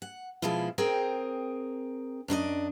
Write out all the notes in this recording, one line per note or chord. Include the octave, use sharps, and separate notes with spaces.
F#5
B2 F3 G#3 E4 F4
C4 G#4 A#4 G5
F#2 D4 E4 D#5